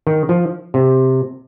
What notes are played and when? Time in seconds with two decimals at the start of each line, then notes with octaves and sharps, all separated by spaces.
0.07 D#3
0.29 F3
0.74 C3